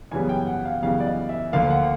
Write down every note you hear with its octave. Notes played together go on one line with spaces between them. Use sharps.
F#2 C#3 E3 G3 B3 G#5
G5
F#5
F5
F#2 C#3 E3 G3 B3 F5
D5
D#5
E5
D2 D3 F3 A#3 F5
F#5